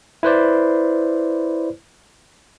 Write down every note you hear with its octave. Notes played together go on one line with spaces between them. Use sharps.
E4 B4 C5 D5